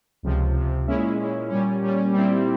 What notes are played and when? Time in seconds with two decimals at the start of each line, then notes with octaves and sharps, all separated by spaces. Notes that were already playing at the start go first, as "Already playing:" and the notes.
0.23 C#2 C3 F3
0.55 C#2 C3 F3
0.86 A#2 G#3 C#4 E4
1.18 A#2 G#3 C#4 E4
1.50 A#2 G3 C#4
1.81 A#2 G3 C#4
2.12 A#2 G3 C4 E4